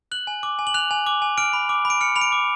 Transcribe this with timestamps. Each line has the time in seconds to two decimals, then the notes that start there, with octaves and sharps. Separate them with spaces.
0.12 F#6 F#7
0.27 G#5
0.43 D6
0.59 G#5
0.67 F#7
0.74 F#6 F7
0.91 G#5
1.07 D6
1.22 G#5
1.38 F6 D7
1.53 B5
1.69 D6
1.85 B5
1.90 D7
2.01 F6 C#7
2.16 B5 F7
2.21 D7
2.32 D6